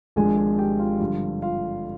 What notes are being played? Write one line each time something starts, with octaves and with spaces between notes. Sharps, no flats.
G#1 G#2 F3 G#3 D4 G#4 G#5
G#4 G#5
G4 G5
F4 F5
G2 D3 F3
F4 F5